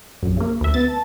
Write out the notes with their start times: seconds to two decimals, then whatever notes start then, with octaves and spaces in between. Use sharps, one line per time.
0.23 A#1 F#2
0.37 C#3 A#3
0.61 D2 E5
0.74 B3 A6
0.88 A5